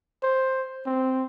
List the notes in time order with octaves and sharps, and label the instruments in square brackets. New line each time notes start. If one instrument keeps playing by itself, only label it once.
[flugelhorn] C5
C4